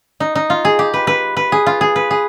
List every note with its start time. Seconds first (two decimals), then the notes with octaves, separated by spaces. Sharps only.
0.20 D#4
0.35 D#4
0.50 F4
0.65 G#4
0.79 G4
0.94 B4
1.07 B4
1.37 B4
1.52 G#4
1.66 F4
1.81 G#4
1.96 B4
2.11 G#4